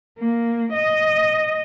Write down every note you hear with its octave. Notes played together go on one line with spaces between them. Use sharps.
A#3
D#5